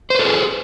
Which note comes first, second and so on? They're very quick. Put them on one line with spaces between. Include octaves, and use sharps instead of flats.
C5 B4 A4 G#4